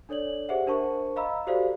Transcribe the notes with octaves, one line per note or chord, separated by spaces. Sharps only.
D4 A4 C#5 D5 F#7
G4 G#4 C5 E5 F#5
D4 A#4 C5 A5 C#6
D#5 F5 A#5 B5 E6
F#4 G4 A4 C5 D5 F5